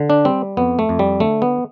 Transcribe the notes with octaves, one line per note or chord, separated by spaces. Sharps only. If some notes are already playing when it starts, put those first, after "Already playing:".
Already playing: D3
D4
G3 C4
F2 B3
A3
F2
G3
D3 A3
B3